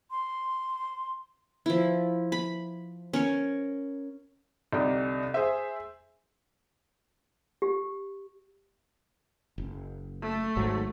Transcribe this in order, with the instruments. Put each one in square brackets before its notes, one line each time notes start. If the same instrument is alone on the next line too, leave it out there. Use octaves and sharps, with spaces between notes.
[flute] C6
[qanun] F3 E4
B5
C#4 A#4 C#5
[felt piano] C2 D3 D4 D#4 G4
G#4 C5 E5
[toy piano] G4
[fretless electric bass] F#1
[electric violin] A3
[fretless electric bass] G#1 G#2 F#3